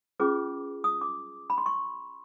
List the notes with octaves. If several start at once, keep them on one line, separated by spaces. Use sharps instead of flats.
C#4 F4 G#4 B4 D6
D#6
D6
B5
C6
C#6